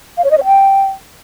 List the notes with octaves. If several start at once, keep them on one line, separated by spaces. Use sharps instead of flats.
F5
C#5
D#5
C#5
G5